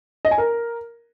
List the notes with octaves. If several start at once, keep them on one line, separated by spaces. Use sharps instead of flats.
D#5
G#5
A#4